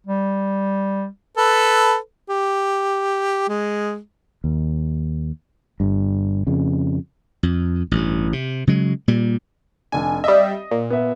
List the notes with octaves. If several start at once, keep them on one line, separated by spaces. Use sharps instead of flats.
G3
A4 B4
G4
G#3
D#2
G1 G2
F2 C#3
F2
A1 G2
C3
C#3 F#3 G#3
A#2 G3
F1 D4 G#5
G3 D#5 E5 D#6
A#2
B3 E5